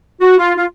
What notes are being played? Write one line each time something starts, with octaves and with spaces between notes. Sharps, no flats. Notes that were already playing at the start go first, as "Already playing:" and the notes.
F#4
F4
F4